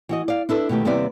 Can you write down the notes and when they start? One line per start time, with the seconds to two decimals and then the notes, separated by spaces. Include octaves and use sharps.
0.09 E3 F#4 D#5
0.28 D5 F5
0.49 D4 E4 A4 B4
0.69 B2 D#3 A3 G4
0.85 D#2 C3 G3 B3 E4 D5